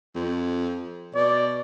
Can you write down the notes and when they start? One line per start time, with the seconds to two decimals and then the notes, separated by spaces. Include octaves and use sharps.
0.15 F2
1.15 B2 D5